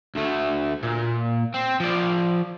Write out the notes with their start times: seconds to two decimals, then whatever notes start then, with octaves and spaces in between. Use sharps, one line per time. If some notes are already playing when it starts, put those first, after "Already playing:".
0.15 D2 A3
0.83 A#2
1.54 C4
1.80 F3 D5